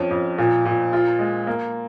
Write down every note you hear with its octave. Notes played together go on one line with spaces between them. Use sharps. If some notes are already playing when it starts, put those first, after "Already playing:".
Already playing: F2 C#4
F2
A#2
A#2
F4
G#3
A#3